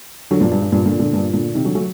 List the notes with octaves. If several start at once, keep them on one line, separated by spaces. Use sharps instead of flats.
D3 F#3
G2 A#2
G2
G2
G2 A#2
A#2 D3
A#2 D3
G2 A#2
A#2 D3
C3 D#3
D3 F#3
F#3 A3